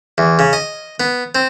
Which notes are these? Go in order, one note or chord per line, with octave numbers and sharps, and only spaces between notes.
E2
C#3
D#5
B3
C4